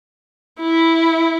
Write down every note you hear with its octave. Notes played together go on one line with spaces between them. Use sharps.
E4